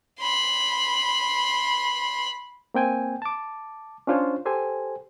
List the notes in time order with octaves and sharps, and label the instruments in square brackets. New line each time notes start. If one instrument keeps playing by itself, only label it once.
[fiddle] B5 C6
[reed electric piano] A#3 C4 G5 G#5
A5 D6
C#4 D4 F4 C5 C#5
G4 A4 C5 G#5